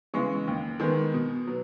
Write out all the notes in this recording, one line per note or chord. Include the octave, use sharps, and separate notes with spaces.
C#3 E3 G#3 B3 C#6
D#2
D#3 G#3 B3
B2
F#3 B3